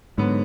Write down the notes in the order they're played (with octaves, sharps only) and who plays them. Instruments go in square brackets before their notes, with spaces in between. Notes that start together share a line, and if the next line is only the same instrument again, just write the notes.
[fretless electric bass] G#2 [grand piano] D3 F#3 B3